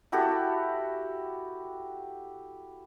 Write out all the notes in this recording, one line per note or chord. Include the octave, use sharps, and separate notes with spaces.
E4 F#4 G4 A4